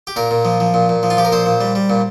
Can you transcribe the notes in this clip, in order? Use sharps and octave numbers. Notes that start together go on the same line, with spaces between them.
G4
A#2 A#4
A#2
F3
F3
A#2
A#2
F3
F4
F3 G4
A#4
A#2 C5
A#2
G3
G3
A#2